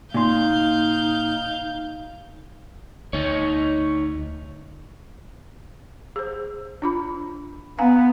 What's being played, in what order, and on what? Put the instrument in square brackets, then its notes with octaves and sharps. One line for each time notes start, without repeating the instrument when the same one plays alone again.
[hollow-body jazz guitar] A#2 C6 [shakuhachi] D#4 [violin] F5 G6
[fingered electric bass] D2 [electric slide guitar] D#4 C#5
[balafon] G#4 C5
D4 F4 B5
[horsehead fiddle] B3 [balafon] F5 G#5 A#5